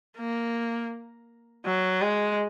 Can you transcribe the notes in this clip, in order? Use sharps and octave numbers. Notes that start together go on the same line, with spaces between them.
A#3
F#3
G#3